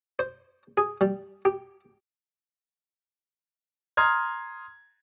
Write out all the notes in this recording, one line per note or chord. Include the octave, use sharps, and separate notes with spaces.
C5
G#4
G3
G4
A#5 C6 D#6 F6 G#6